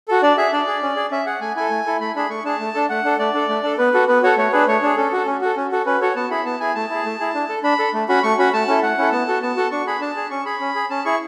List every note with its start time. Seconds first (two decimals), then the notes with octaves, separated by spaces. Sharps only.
0.08 F#4 A4
0.23 D4 D5
0.37 G#4 E5
0.52 D4 D5
0.67 G#4
0.83 C#4
0.96 G#4
1.11 C#4 E5
1.26 G#4 F#5
1.41 A3 G#5
1.56 E4 A4 G#5
1.71 A3
1.86 E4 A4
2.00 A3 B5
2.16 D4 G#4 B5
2.30 A3 C#6
2.45 D4 G#4 A5
2.60 A3
2.74 D4 A4
2.89 A3 F#5
3.04 D4 A4
3.19 A3 D5
3.34 D4 A4
3.49 A3
3.63 D4 A4
3.78 B3 B4
3.94 F#4 A4
4.08 B3 B4
4.23 F#4 A4 C#5
4.37 A3 C#5
4.52 D4 G#4 B4
4.67 A3 C#5
4.83 D4 G#4
4.97 C#4 A4
5.12 F#4 A4
5.26 C#4
5.41 F#4 A4
5.57 C#4
5.72 F#4 A4
5.86 C#4 B4
6.01 F#4 A4 C#5
6.16 B3 A5
6.30 E4 G#4 B5
6.46 B3 A5
6.60 E4 G#4 G#5
6.75 A3 A5
6.90 E4 G#4
7.05 A3
7.20 E4 G#4
7.34 D4
7.49 A4
7.64 D4 B5
7.79 A4
7.94 A3
8.09 C#4 F#4 B5
8.23 A3 C#6
8.38 C#4 F#4 B5
8.53 A3 A5
8.68 C#4 E4 A4
8.82 A3 F#5
8.98 C#4 E4 A4
9.12 B3 A5
9.28 F#4 A4
9.42 B3 A5
9.57 F#4 A4
9.71 D4 C#6
9.87 G#4 B5
10.01 D4 A5
10.16 G#4
10.31 C#4 C#6
10.46 G#4 B5
10.60 C#4
10.75 G#4
10.90 C#4 A5
11.05 E4 G#4 C#6